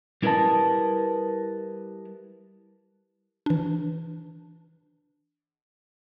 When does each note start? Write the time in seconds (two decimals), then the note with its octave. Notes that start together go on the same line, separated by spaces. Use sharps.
0.22 G3 E4 A#4 B4 D#5 A5
3.46 E3 D4